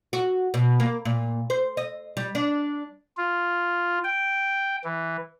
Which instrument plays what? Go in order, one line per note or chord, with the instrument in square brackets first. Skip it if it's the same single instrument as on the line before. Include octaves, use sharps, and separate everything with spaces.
[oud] F#4
B2
A#3
A#2
C5
D#5
G3
D4
[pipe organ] F4
G5
E3